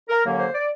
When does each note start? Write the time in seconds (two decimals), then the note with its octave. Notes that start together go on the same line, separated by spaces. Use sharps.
0.09 A#4
0.24 D#2 D3 F#3 A#3 C#4
0.39 C5
0.54 D5